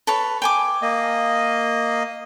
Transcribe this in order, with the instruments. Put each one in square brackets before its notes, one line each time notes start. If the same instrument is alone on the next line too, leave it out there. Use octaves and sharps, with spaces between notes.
[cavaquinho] A4 B4 C#5
G5 G#5 D6
[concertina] A#3 D#5